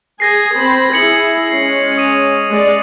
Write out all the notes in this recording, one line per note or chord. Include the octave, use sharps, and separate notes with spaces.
G#4 G#5 G#6 A#6 C7
C4 C5 B5
E4 G#4 G#6 C#7 F#7
G#3 C#4 C7
D#6 D#7
G#3 D5